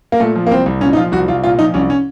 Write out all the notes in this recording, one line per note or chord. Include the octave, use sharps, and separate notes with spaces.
A#3
A#2 A3
F3
A#3
C2 C4
C2
A#2 C#4
D#4
F3 F4
C2 F#4
C2 F4
A#2 F4
F3 D#4
C2 C#4
C#4